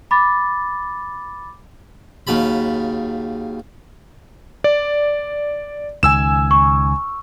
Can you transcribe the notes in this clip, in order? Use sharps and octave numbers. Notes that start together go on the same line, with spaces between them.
B5 D6 A6
D#2 C#3 F#3 A5 B5
D5
C#2 D#3 G#5 E6 E7
C#6